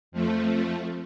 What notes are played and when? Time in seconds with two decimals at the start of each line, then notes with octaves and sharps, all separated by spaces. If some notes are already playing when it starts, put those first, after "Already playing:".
0.12 F2 F3 A3